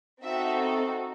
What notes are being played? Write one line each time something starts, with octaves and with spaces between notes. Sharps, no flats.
C4 D#4 F#4 A4 E5